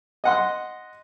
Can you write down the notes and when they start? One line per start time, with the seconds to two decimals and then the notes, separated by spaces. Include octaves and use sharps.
0.24 D#5 F#5 C6